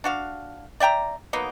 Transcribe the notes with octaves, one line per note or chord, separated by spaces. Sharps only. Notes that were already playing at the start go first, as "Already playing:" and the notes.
D4 F#4 F5
D5 E5 G5 A#5
F#3 A#3 B3 D#4